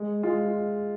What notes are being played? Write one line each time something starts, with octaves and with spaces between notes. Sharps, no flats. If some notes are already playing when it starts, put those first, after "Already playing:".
Already playing: G#3
G#3 F4